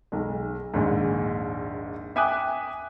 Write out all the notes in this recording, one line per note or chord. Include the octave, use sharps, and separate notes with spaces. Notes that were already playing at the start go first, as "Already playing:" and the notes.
B1 G#3
A#1 D#2 G#2
E5 G5 G#5 D6 D#6 F#6